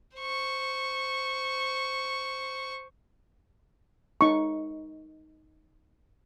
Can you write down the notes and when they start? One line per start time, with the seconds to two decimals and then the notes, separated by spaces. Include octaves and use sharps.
0.17 C5 C#6
4.21 D#4 C#6